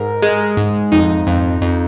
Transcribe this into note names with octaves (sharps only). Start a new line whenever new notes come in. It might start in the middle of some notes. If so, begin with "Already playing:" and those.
Already playing: G#2 A#4
G#3
G#2
F2 D#4
F2
F2